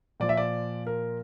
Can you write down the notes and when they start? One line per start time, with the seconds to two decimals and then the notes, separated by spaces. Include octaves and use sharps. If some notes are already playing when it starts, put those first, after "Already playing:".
0.20 A#2 F3 D5
0.29 E5
0.37 D5
0.87 A#4